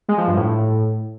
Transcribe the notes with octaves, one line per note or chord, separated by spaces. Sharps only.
G#3
F3
G2
A2